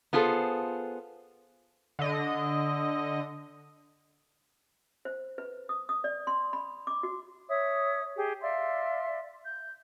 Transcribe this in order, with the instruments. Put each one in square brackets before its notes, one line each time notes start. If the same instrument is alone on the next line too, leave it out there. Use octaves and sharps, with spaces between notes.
[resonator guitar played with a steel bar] B3 F4 G#4 A4 C5
[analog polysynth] D3 D#5
[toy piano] C5
B4
D#6
D#6
D5
C6
B5
D6
F#4
[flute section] C#5 E5 D#6
G4 G#4
D5 E5 F5 C6
G6